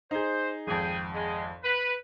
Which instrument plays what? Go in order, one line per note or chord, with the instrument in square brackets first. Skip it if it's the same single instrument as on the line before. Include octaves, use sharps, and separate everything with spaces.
[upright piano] D#4 G#4 [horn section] C5
[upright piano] G#1 F2 [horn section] G#4 G5
[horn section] G#3
B4